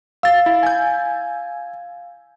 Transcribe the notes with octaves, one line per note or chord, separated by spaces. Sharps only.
F5 E6 A6
E4
G#5 G6